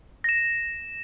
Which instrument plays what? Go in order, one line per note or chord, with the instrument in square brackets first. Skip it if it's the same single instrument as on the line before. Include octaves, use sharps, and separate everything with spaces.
[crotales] A#6 E7